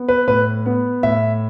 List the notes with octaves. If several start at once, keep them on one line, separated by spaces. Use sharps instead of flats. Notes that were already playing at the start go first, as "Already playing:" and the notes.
Already playing: B3
B4
A2 B4
B3
A2 E5